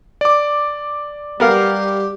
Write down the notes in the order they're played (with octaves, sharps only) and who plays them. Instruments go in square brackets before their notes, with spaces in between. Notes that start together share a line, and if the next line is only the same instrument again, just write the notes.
[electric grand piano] D5 D6
[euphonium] G3 [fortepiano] B3 A#4 F5 [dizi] G4